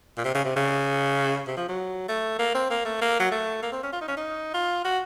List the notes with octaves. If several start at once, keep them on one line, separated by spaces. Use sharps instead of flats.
A#2
C3
C#3
C3
C#3
C3
F3
F#3
A3
A#3
C4
A#3
A3
A#3
F#3
A3
A#3
C4
C#4
F4
D#4
C#4
D#4
F4
F#4